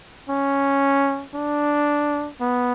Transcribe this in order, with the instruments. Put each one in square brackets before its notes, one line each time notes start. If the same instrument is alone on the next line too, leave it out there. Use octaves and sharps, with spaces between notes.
[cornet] C#4
D4
B3